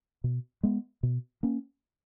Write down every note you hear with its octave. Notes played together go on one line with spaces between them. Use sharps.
B2
G#3 B3
B2
A#3 C#4